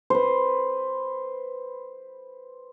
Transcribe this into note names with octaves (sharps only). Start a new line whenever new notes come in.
B4 C5